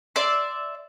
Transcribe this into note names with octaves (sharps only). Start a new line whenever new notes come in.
D5 E5 C6